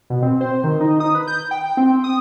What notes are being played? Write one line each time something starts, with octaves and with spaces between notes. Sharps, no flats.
B2
C4
C5
D#3
D#4
D#6
B4
G6
G5
C4
D#6